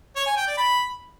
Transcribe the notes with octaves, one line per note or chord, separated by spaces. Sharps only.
C#5
G#5
G5
D5
B5